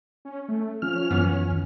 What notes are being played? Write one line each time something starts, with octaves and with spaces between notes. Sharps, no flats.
C#4
A3
F3 C#4 F6
F#2 E3 B3
D#2